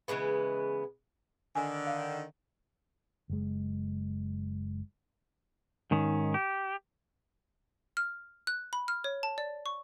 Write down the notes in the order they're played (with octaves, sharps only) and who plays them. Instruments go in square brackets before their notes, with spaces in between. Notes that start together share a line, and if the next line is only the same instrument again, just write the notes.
[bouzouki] C#3 E3 G#3 B3
[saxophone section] D3 D#3 [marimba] G#5
[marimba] F5
[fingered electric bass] F#1 G#3
[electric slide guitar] G#2 D#3 C#4
G4
[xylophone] F6
F#6
B5
F6
C#5
A5
D5
C#6